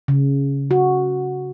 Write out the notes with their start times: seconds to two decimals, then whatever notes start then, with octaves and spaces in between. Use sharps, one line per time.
0.08 C#3
0.71 F#4